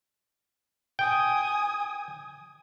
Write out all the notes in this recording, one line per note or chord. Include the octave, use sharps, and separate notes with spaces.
G5 G#5 D#6